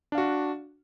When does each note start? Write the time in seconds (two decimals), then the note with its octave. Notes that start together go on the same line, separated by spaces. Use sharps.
0.12 D4
0.15 F5
0.18 F#4